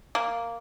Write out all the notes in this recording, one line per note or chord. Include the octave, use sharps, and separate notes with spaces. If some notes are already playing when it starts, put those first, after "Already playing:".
A#3